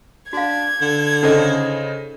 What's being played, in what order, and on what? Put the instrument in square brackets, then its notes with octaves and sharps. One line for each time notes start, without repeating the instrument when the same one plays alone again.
[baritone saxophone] D4 [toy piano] F#4 F5 [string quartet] G#6
[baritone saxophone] D3
[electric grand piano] C#3 C5 D#5 [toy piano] C#4 D#4 A4